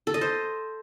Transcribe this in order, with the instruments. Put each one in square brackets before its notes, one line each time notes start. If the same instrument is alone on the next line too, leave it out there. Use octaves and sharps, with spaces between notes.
[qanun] A4
D#5
C5